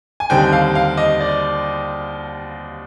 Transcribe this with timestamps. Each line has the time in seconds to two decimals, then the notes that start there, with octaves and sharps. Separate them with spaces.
0.20 G#5
0.30 D#2 D3 G3 C4 D#4 G5
0.52 F5
0.75 F5
0.97 D#5
1.20 D5